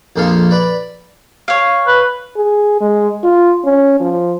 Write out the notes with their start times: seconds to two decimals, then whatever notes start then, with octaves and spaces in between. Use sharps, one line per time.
0.16 A#1 F2 A#3 A4 F5
0.51 B4 D5
1.48 C#5 F5
1.87 B4
2.37 G#4
2.80 G#3
3.24 F4
3.65 C#4
4.00 F3